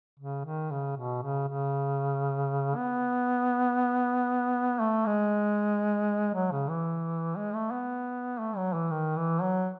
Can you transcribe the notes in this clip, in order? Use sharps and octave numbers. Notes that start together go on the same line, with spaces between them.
C#3
D#3
C#3
B2
C#3
C#3
B3
A3
G#3
F#3
C#3
E3
G#3
A3
B3
A3
F#3
E3
D#3
E3
F#3